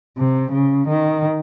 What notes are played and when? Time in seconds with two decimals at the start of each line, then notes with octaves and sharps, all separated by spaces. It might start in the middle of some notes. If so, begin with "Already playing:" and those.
0.18 C3
0.53 C#3
0.88 D#3